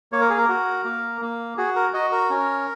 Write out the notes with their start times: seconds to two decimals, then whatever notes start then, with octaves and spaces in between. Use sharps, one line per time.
0.12 A#3 C#5
0.21 A#4
0.30 G#4
0.38 A#4
0.49 F#4
0.84 A#3
1.21 A#3
1.57 F#4 G#4
1.76 A#4
1.93 F#4 D#5
2.12 A#4
2.30 C#4